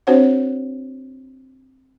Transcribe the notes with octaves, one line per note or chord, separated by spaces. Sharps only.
C4 D4 F#4 C5 C#5 F#5